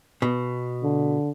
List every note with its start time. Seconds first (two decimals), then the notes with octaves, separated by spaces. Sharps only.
0.22 B2
0.83 D3